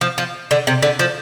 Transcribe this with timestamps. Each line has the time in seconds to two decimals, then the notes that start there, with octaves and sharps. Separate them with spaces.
0.01 F3
0.18 F3
0.51 D3
0.67 C3
0.83 D3
0.99 F3